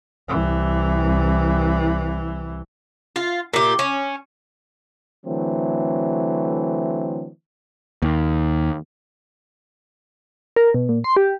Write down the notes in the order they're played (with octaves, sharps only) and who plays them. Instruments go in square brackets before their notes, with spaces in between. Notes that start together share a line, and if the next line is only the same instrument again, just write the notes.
[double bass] C2 E3
[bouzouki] F4
A#2 G4
C#4
[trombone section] D3 E3 F#3 A3 C4
[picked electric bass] D#2
[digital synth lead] A#4
B2
A#2
C6
G4